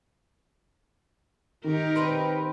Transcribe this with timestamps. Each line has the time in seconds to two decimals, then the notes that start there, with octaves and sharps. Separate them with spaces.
1.64 D#3 D#4 G4 A#4
1.96 C4 B4 G5